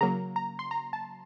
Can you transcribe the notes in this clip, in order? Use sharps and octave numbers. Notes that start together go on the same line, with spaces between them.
C#3 F#3 A#3 A#5
A#5
C6
A#5
A5